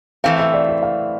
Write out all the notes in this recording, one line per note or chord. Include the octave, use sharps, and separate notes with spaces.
A2 E3 A3 C4 F5
E5
D5
E5
F5